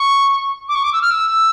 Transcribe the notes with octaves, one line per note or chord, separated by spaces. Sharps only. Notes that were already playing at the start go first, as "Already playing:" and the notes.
Already playing: C#6
D6
C#6
D6
E6
F6
E6